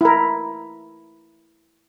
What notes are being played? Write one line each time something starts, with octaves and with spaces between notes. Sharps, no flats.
E4 A#4